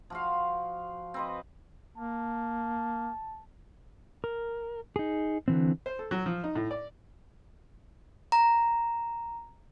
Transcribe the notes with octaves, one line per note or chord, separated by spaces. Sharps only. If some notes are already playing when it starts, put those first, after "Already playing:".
F3 F#4 F5
C4 B4 D#5
A#3 A5
A#4
D#4 G#4
D3 E3 C4
C5
A4
F#3
F3
D#4
A2
D5
A#5